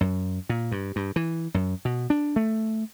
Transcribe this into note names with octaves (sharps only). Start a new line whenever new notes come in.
F#2
A#2
G2
G2
E3
F#2
B2
D4
A3